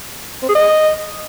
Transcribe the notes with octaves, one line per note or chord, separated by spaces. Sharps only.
C4
G#4
D#5